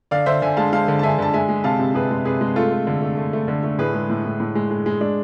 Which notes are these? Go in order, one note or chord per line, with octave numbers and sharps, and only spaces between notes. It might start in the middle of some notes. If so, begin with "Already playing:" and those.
D3 D5 F5
D3 C5 E5
D3 E5 G#5
G#3 F5 A5
G#3 F5 A5
D3
A5
D3 E5 G#5
D3 A5
G#3 E5 G#5
G#3
C3 F5 A5
C3
C3 G#4 B4
G#3
C3 G#4 B4
G#3
A3 F4 A4
A3
D3
A3
A3
A3
D3
A3
A2 G#4 B4
G#3
A2
A2
A2
G#3
G#3
G#3
G#3 D4